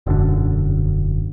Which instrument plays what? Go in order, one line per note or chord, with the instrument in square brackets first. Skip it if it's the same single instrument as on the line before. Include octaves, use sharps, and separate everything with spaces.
[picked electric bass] E1 F#2 D3